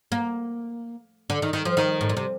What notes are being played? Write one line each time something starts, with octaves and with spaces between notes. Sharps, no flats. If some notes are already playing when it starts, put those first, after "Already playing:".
A#3
D3
D#3
D#3
F3
D#3
A2
A#2
C3